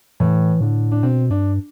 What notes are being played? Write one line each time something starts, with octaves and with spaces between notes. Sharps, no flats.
A2 E3
A2 D3
D4
B2 C4
G2 D4